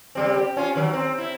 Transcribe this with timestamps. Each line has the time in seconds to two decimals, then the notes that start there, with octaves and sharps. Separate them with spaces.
0.15 C#3 G3 C4
0.36 G4
0.57 C#4 F4
0.76 D#3 F#3
0.93 C4
1.18 E4